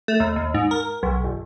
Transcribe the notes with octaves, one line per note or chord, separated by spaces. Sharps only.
A3
D#2
D#2
G#2
A#4
B1
G1